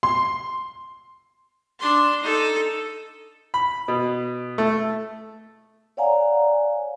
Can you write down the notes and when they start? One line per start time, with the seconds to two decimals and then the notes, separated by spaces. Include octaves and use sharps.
0.03 C6
1.79 D4 C6
2.23 D#4 A4
3.54 B5
3.88 B2
4.58 A3
5.97 C#5 D5 F5 F#5 G#5 A#5